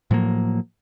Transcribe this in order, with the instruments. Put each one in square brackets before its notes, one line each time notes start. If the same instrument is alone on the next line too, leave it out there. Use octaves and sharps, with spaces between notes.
[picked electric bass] A2 F3 F#3 A#3